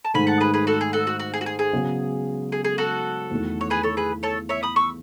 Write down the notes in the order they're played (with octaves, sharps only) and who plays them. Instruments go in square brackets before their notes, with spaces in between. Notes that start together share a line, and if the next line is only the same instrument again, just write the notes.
[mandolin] A5
[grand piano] G#2 D#3 A3 [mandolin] G#5 B5
[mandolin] F#5 A5
G#4 B4
G#4 B4
F#4 A4
G#4
F#4 A4
F#4
F#4
G#4
F#4
G#4
G#4
[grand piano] C#3 F#3 B3
[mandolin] G#4
G#4
F#4 A4
[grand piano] E2 D#3 A3 E4
[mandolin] C#5
G#4 B4
A4 C#5
G#4 B4
A4 C#5
C#5 E5
B5 D#6
C#6 E6